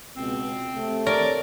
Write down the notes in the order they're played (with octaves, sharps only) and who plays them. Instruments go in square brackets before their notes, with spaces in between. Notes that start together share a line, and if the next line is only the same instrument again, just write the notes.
[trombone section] C#2 B2 [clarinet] C4
[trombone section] C3 A3
[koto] A#4 [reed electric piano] C#5 [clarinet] D5